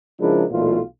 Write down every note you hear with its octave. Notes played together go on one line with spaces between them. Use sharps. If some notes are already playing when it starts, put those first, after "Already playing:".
C#3 F3 G#3 D4 E4 A#4
B1 A#2 E3 A3 F4